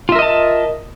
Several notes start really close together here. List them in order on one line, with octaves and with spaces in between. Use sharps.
F4 E5 A#4 D#5 A5